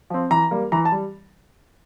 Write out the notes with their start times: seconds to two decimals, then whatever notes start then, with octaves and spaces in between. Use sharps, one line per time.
0.10 F3 C4
0.31 E3 A#5
0.51 G3 A#3
0.72 E3 A#5
0.85 A5
0.92 G3